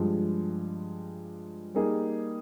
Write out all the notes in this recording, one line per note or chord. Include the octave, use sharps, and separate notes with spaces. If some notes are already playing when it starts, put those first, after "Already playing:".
Already playing: G2 F3 G#3
G3 A#3 D#4 G#4